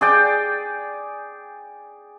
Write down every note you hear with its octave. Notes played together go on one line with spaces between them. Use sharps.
G#4 D5 G5